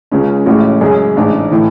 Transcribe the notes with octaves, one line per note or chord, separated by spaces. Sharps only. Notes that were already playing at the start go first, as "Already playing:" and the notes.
C#2 C#3 G#3 C#4
A1 A2 G#3 C#4 F#4
F#2 C#3 G#3 C#4 G#4
A1 G#2 G#3 D4
A2 E3